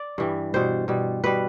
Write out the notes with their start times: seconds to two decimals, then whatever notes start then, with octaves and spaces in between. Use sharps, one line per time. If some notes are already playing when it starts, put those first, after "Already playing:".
Already playing: D5
0.18 G2 E3 G3
0.54 B2 G3 C5
0.88 B2 G3
1.24 B2 G3 B4